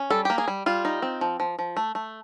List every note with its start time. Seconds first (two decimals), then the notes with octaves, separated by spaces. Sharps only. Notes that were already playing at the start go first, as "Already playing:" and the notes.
Already playing: C#4
0.10 G3 A4
0.25 A#3 G4
0.38 G#4
0.48 G3
0.66 G3 F4
0.85 D#4
1.02 C4
1.21 F3
1.40 F3
1.59 F3
1.77 A3
1.95 A3